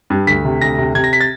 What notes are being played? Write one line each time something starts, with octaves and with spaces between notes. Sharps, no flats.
G2
D2 B6
C3
D2 A#6
C3
C3 G#6
A#6
B6
A6